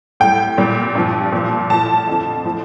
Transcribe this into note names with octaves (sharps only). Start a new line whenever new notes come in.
A2 G3 G5
A#2 G3
G2 F3
A#2 F3
A2 F3 A5
F2 D3 F3
A2 F3